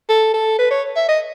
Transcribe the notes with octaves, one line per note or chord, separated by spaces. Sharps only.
A4
A4
B4
C#5
E5
D#5